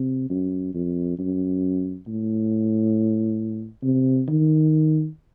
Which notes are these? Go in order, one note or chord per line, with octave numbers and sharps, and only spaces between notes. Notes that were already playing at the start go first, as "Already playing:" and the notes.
Already playing: C3
F#2
F2
F#2
A2
C3
D#3